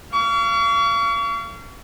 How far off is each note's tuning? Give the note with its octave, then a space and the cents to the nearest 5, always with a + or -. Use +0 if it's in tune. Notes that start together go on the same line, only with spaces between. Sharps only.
F5 -30 C#6 +40